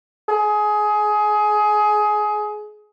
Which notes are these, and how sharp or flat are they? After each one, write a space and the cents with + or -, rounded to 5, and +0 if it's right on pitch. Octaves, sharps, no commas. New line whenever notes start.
G#4 +20